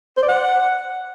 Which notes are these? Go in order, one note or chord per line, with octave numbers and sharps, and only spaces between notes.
C5
D5
F#5